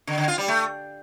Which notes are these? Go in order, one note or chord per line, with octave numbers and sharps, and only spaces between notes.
D3
D3
F4
G3
A3